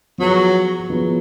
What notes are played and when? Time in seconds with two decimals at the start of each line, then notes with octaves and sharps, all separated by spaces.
0.18 F3 F#3 B3 F4 G#4 B4
0.90 F3 B3 F4 G#4 B4